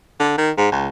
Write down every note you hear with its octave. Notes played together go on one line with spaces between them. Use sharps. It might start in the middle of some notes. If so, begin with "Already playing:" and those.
D3
D#3
G#2
C#2